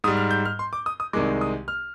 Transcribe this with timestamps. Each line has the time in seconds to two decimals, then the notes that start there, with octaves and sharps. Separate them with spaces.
0.04 G#2 D#6
0.08 G3
0.17 F6
0.31 G6
0.45 F6
0.59 C6
0.73 D6
0.86 D#6
1.00 D#6
1.13 C2 C3 D#3 G#3 D6
1.41 D#6
1.68 F6